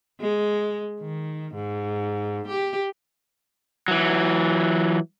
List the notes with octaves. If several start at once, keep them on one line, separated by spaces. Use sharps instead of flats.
G#3
D#3
G#2
G4
E3 F#3